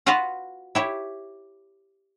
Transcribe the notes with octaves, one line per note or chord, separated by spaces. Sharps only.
F4 F#4 B4 D#5 F5 F#5
E4 G4 C#5